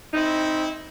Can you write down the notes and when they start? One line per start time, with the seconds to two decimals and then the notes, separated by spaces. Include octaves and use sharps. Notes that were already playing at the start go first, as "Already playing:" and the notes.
0.13 C4 D#4 E4